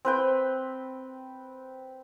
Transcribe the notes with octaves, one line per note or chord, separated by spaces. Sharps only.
C4 B4 G5